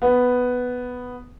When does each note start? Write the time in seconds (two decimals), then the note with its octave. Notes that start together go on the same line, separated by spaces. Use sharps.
0.02 B3